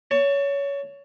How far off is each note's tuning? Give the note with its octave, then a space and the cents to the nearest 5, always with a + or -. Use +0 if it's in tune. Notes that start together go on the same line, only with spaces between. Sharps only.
C#5 +20 A5 +25